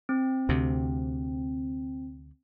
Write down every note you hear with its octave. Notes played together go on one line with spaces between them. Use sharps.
C4
D2 C3